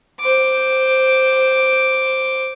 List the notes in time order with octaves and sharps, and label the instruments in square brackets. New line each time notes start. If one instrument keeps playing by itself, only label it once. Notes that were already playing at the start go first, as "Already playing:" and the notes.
[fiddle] C5 D6